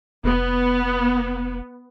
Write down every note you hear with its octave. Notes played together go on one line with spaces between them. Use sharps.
F1 B3